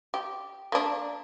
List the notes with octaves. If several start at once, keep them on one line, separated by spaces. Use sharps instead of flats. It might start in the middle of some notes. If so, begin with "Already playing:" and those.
G4
A#3 D4